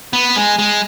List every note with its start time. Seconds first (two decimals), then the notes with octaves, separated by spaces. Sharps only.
0.13 B3
0.36 G#3
0.59 G#3